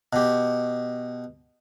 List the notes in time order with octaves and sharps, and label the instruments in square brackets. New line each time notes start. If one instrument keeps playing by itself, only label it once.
[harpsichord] B2 G4